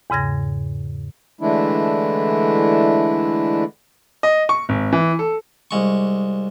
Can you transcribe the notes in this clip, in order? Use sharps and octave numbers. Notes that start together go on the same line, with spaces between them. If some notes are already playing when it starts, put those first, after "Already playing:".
E2 G#2 C#3 G#6 A#6
D3 E3 G#3 A3 D4 E4
D#5
C#6
G#1
E3
A4
C2 G#3 C#6